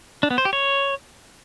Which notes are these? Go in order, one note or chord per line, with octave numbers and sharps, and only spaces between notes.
D4
B3
C5
G4
C#5